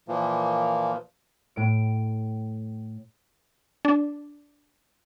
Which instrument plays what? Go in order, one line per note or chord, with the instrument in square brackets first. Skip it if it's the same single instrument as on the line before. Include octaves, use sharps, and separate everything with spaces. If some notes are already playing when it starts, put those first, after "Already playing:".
[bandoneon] A#2 E3 F3 A#3
[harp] A2 D7
[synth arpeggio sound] D4